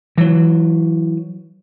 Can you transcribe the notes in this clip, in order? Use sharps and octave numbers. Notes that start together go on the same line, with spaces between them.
E3 F#3